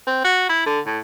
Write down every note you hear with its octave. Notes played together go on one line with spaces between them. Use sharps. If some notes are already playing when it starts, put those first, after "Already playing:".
C4
F#4
E4
D3
A2